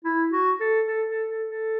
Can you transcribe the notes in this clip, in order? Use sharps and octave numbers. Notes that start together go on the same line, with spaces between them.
E4
F#4
A4
A4
A4
A4
A4